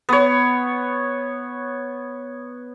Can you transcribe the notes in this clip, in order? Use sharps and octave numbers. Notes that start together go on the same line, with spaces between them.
B3 C#5